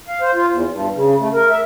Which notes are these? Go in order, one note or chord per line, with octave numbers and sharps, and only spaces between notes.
F5
C5
F4
E2
G2
C#3
A3
A#4
E5